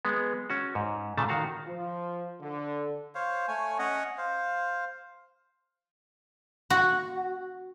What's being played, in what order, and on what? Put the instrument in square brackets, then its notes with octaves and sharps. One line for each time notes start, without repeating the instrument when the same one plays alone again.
[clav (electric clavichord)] G#3 B3
C#4 F#4
G#2
A#2 C#3 A3 A5
D#3 F#4 F5
[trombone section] F3
D3
[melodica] C5 C#5 F5
A3 C#5 G#5
C#4 C#5 D#5 F#5
C5 F5
[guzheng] F#4